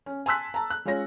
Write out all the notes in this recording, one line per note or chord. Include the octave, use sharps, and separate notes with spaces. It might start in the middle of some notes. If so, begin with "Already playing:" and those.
C#4
G#5 A5 C6 E6 F#6 B6
A5 A#5
F#6
G#3 C#4 F4 C#5 A#6